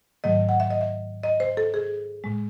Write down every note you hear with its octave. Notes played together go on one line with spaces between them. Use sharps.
G#2 D#3 F#3 A3 D#5
F#5
E5
D#5
E5
D#5
C5
A4
G#4
A2 G#3